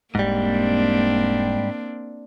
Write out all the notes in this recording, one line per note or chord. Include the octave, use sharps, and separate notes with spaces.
E1 G#2 G3 A#3 C4 D4